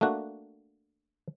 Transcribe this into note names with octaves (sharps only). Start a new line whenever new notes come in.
A3 A#3 D4 F#4